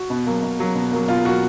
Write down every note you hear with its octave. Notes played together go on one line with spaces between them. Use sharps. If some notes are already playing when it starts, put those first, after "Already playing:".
Already playing: F#4
B2
F#3 A#3
B2
F#3 A#3
B2
F#3 A#3
B2 F4
F#3 A#3 F#4